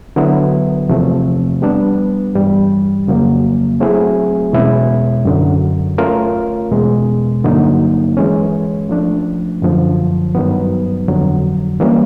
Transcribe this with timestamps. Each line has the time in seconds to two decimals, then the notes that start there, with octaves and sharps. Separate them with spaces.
0.16 D3 F#3 B3 E4
0.89 E2 C3 F3 A3 C4
1.62 G3 B3 D4
2.35 G2 E3 G3
3.08 F2 C#3 F#3 A#3
3.80 F#3 A3 C4 E4 G#4
4.53 E2 B2 G#3 C#4 E4
5.25 F#2 D3 F#3
5.98 A3 C#4 F4 A#4
6.71 E2 B2 G#3
7.44 G2 D3 F#3 A#3 D#4
8.17 E3 G#3 C#4
8.89 F3 A3 D4
9.62 F#2 D3 F3
10.35 G2 D#3 F#3 B3
11.08 F2 D3 F#3
11.80 E3 G3 A#3 C#4